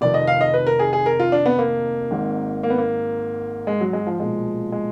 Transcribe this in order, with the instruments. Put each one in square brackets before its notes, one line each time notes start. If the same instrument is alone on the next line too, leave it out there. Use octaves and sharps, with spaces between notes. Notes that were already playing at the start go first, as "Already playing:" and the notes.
[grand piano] F1 F2 D#3 D5
D#5
F5
D#5
B4
A#4
G#4
G#4
A#4
F4
D4
B3
A#3
G#1 G#2 D#3
A#3
B3
A#3
G#3
F#3
G#3
F3
B1 A#2 F3 G#3
G#3